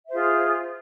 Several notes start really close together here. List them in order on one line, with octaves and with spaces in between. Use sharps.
E5 C5 F4 G#4